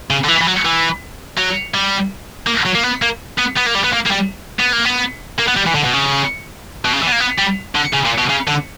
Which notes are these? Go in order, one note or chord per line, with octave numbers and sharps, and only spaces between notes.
C#3
D3
E3
E3
F#3
E3
F#3
G3
A#3
F#3
A#3
B3
A#3
B3
B3
A#3
G3
B3
A#3
A#3
G3
B3
A#3
B3
A#3
B3
G3
E3
D3
B2
C#3
B2
C#3
E3
B3
A#3
B3
G3
D3
C#3
A#2
B2
C#3
D3